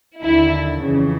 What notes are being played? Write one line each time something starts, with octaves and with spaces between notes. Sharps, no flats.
D#2 D3 E4
F2 C#3 E3